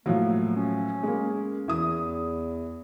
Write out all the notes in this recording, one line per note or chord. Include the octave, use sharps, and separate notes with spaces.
A2 F3 F#3 A#3
C#4
G#3 A#3
E2 E3 D#6